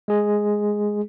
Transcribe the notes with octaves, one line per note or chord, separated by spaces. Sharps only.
G#3 G#4